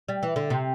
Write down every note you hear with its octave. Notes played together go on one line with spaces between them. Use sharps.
G3
E3
D3
C3